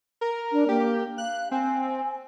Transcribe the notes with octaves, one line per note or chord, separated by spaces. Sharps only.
A#4
D4
A#3 G4
F5 F#6
C4 G#5